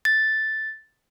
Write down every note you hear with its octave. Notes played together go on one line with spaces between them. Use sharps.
A6